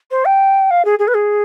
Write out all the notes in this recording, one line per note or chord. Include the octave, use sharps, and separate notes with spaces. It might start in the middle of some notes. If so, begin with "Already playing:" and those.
C5
G5
F5
G#4
G#4
B4
G#4